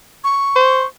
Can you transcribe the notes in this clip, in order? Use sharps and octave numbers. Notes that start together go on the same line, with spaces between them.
C#6
C5